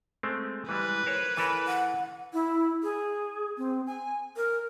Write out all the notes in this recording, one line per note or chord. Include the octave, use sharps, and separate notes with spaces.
G#3 A3 C4
E3 G3 G#3 B4
A#4 C5 C#5
E3 A4 A#4 B5
F#5
E4
G#4
C4
G#5
A#4